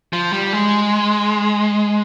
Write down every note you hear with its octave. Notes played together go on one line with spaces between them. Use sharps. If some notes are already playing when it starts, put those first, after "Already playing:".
F3
G3
G#3